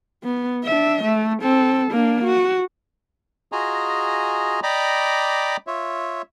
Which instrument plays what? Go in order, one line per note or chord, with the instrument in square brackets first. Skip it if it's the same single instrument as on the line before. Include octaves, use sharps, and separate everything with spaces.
[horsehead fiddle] B3
D4 E5
A3
C4 A4
A#3 D4
F#4
[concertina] F4 F#4 G#4 D#5 G#5 A#5
D5 D#5 G5 A#5 B5 D6
F4 C#5 E5